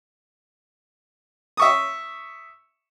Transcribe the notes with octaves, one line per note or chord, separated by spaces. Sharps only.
E5 C#6 D#6